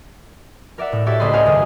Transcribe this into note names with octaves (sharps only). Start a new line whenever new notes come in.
A#4 D5 E5 F#5
A2
F#4 G4 A4 C#5 D5 E5
C#2 A3 C#4 D#5 B5 C6
A4 C5 F#5 G#5 D#6 F6
G#1 C#2 F#2